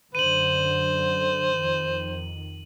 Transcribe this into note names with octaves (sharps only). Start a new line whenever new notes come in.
F#2 D3 C5 D#7 F#7
F2 D#3